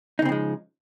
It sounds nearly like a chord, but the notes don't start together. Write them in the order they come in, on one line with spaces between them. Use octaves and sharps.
D#4 C#3 C4 F3 G#3